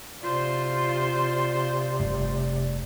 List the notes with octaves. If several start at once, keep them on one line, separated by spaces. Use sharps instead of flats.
C3 F4 C5 D5
F1 G2